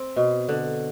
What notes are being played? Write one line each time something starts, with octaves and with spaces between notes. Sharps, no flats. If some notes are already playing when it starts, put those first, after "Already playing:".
Already playing: C4
B2
D3